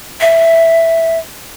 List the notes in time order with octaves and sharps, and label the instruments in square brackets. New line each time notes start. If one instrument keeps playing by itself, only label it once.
[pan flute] E5